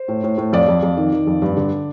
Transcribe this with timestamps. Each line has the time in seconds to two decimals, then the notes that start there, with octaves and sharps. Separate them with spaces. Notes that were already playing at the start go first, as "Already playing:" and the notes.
Already playing: C5
0.08 A2
0.23 A2
0.38 A2
0.53 F2 D5
0.68 F2
0.83 F2
0.97 D#3
1.12 D#3
1.27 F2
1.42 G2
1.57 D3